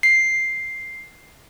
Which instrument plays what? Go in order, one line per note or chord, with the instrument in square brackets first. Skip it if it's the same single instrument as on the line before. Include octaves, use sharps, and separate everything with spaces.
[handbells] C7